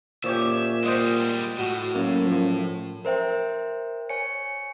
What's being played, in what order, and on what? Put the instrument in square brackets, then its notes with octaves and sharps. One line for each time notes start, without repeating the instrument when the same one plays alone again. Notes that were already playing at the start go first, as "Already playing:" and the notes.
[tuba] A#2 [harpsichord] F3 C#4 G4 [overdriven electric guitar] E5
[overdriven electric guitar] G3 G#3 [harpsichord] C5 D#5 F#5
[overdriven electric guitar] A2 [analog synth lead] F#4
[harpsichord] F#2 [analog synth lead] A#3 [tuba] C#4
[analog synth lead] F3
[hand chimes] A#4 C5 E5 G5
C#5 G#5 C#7